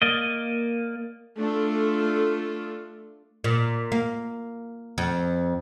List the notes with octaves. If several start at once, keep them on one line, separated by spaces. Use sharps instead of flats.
A#3 D5 D#5
A3 D4 F4 A4
A#2
A#3
F2